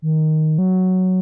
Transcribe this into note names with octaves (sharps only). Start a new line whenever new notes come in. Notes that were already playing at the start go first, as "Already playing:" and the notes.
D#3
F#3